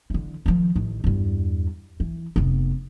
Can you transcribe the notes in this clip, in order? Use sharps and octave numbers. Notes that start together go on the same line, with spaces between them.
D3 E3
D#3 F3
A1 D#3
E2 G2
E3
F1 B3